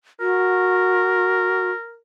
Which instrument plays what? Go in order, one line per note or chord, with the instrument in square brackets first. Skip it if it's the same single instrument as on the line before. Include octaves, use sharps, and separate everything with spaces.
[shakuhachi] F#4 [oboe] A#4